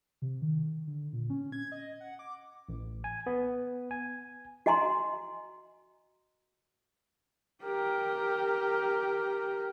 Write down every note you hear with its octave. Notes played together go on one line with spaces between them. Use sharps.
C3
D#3
D3
A#2
C#4
G#6
D#5
F#5
D6
A1
G#5
B3
G#5
F#4 D#5 G#5 A#5 C6
G4 A#4